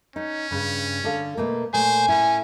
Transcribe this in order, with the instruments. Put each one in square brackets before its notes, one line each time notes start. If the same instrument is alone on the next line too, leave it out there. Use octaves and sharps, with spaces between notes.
[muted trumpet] C#4 [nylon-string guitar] D#4
[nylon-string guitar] G2 C#3
D3 A4 F5
B2 A3 A#3
[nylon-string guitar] A#2 A3 [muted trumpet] C5 [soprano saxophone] G#5
[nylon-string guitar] A2 E4 [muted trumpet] C#4